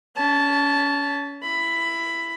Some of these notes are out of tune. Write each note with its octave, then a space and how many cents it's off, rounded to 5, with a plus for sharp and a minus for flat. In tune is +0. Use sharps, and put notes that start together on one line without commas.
C#4 +30 A5 -10
E4 +15 B5 +10